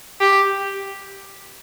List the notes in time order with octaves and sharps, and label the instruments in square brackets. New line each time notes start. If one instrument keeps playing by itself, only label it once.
[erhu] G4